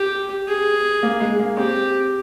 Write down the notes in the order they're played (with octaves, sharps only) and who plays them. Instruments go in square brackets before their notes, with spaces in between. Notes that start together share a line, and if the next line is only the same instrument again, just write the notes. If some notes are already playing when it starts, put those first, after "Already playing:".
Already playing: [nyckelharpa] G4
G#4
[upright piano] A#3
G#3
A#3
[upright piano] C4 [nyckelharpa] G4